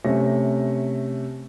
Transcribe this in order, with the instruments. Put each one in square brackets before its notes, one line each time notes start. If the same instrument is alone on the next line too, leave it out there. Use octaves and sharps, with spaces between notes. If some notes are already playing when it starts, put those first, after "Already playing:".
[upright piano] C3 A3 C#4 A#6